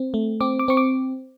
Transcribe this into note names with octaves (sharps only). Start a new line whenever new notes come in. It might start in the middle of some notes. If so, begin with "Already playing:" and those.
Already playing: C4
A3
C4 D6
D6
C4 C#6
D6